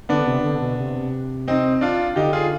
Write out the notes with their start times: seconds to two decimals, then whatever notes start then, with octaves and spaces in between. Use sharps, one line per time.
0.09 D3 B3 D4
0.26 C3
0.44 D3
0.61 B2
0.79 C3
1.48 C4 D#4
1.81 D4 F4
2.16 D3 D#4 G4
2.33 F4 G#4